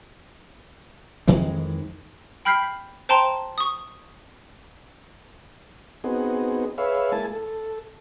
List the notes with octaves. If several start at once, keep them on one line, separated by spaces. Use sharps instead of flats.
F2 D#3 E3 G#3
G5 B5 F6 G6 B6 C7
C5 G5 A5 A#5 C6
C#6 D#6
B3 C4 D#4 F#4 G#4
G#4 B4 C#5 E5 F5
G#3 A#3 E4 G#5 A5
A4